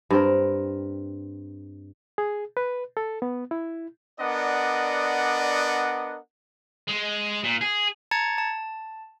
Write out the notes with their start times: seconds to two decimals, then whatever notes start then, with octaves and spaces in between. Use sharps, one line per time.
0.10 G2 C4 A#4
2.18 G#4
2.57 B4
2.97 A4
3.22 B3
3.51 E4
4.20 B3 D4 A#4 D5 D#5 F#5
6.88 G#3
7.44 A#2
7.61 G#4
8.11 A5 A#5 G#6 A6 C#7
8.38 A5